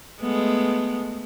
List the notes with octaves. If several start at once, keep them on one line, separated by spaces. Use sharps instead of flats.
G#3 A3 B3